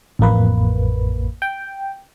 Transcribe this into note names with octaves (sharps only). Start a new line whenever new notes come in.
A1 F2 A#3 B4
G5